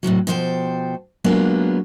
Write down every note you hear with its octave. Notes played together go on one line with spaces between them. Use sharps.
A2 C3 F3 F#3
B2 F3 A4 C5 D#5 G5
F#3 G#3 A#3 B3 D4 F4